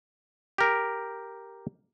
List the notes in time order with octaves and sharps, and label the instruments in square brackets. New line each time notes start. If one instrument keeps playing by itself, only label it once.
[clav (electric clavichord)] G4 A#4